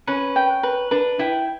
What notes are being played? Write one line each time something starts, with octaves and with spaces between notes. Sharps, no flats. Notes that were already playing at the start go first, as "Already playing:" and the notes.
C#4 B4
G5
B4
D4 B4
E4 G5